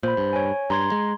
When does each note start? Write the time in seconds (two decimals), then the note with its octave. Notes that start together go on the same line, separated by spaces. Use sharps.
0.03 A#2 C5 B5
0.17 G2
0.33 C#5 G#5
0.70 G2 A#5 C6 G#6
0.92 G#3